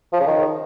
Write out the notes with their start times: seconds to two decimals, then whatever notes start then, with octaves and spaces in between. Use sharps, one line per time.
0.13 F3
0.20 C#3
0.27 D#3